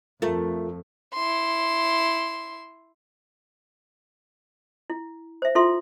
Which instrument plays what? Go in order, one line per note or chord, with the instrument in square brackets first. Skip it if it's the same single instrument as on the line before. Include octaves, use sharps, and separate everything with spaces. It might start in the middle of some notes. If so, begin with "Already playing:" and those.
[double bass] F2 [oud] A3 [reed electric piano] F4 A#4
[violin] E4 C6
[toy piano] E4
C5 E5
E4 F4 A4 E5 C6